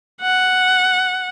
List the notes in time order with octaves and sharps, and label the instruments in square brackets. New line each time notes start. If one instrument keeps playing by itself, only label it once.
[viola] F#5